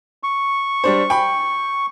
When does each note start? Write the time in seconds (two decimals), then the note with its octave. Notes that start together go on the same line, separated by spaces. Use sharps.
0.23 C#6
0.84 G3 D4 C5
1.10 G5 B5